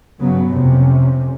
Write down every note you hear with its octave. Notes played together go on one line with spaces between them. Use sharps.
G2 C#3 F#3 B3
F1 F2 C3 C#4